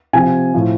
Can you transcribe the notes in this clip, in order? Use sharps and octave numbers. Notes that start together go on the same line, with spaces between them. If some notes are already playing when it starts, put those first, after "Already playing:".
C3 F3 G#5
A2 F3